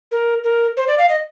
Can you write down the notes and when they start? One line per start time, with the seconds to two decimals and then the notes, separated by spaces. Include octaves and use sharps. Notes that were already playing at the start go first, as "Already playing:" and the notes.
0.11 A#4
0.44 A#4
0.77 C5
0.88 D5
0.98 F5
1.09 D#5